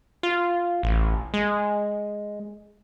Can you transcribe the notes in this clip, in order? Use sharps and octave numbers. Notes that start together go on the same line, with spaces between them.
F4
A1
G#3